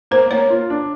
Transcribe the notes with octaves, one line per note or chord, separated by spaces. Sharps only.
A#3 C5
A#3 C#5
F4
D4